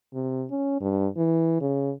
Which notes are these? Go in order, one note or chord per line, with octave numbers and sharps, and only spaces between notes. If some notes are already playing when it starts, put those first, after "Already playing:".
C3
C#4
G2
E3
C#3